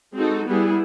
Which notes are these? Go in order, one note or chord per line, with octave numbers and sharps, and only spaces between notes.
G#3 C4 D#4 F#4 A4
G3 B3 E4 G#4